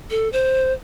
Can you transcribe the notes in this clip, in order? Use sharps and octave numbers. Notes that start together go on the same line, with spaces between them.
A4
C5